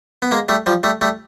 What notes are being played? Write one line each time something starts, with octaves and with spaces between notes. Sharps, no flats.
B3
G#3 A#3
G3 A3
F3 G3
G3 A3
G3 A3